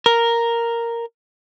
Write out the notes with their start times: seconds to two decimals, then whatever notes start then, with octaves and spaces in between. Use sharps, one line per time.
0.06 A#4